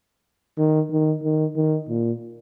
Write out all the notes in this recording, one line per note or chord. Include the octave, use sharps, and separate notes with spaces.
D#3
D#3
D#3
D#3
A#2